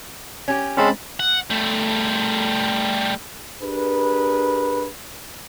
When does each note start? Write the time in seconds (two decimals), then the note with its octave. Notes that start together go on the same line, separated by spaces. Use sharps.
0.48 C#4 G4
0.77 G#3 C4 C#4 C5 A5 B5
1.20 F#5
1.50 G3 A3
3.62 D4 G4 G#4 A#4 B4